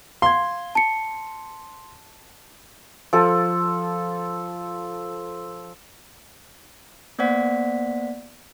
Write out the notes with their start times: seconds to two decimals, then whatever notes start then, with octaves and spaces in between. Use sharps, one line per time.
0.22 F5 C6 G#6
0.75 A5 C#7
3.13 F3 A4
7.19 A#3 B3 C5 D5 F#5 B6